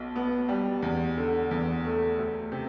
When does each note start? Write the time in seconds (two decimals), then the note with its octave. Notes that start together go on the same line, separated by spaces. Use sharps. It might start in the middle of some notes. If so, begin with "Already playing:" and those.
Already playing: B1 B2
0.15 B3
0.49 G3
0.82 E2
1.17 D3
1.51 E2
1.85 A3
2.18 D2
2.52 C3